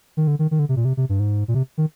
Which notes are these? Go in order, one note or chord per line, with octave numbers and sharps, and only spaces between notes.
D#3
D3
D#3
D#3
D3
C3
A#2
C3
C3
G2
G#2
A#2
C3
D#3